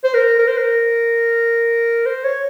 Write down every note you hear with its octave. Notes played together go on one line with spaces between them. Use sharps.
C5
A#4
A#4
C5
A#4
C5
C#5